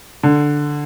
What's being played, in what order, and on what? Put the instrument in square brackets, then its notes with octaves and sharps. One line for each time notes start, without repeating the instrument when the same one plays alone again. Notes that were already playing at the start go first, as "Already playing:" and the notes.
[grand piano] D3